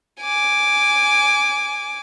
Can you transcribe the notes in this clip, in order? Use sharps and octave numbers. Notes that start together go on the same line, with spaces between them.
G#5 D6